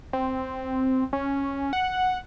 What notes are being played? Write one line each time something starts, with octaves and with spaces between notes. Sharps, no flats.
C4
C#4
F#5